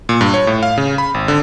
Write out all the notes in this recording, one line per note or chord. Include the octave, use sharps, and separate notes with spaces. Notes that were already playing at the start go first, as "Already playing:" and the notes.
A#2
G2
C#5
A2
F5
C#3
B5
G#1
D3